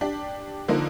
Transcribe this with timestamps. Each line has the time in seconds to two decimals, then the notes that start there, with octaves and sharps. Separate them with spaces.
0.01 D4 G4
0.68 D3 F3 A#3 D#4 C5